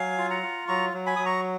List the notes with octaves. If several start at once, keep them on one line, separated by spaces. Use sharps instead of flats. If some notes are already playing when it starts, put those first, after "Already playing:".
Already playing: F#3 F5 G#5
F4
F#5 A#5
F4
F#3 A#5 C#6
F#3
G#5 B5
F#3 D#6
A#5 C#6